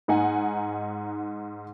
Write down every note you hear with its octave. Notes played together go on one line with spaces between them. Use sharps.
G#2 D#4 F#5 G#5